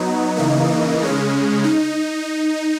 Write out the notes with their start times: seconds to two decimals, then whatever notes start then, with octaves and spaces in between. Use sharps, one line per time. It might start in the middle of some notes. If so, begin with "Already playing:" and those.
Already playing: F#3 B3 D#4
0.36 C#3 E3 A#3 D#4
1.01 C#3 G#3 C#4
1.64 D#4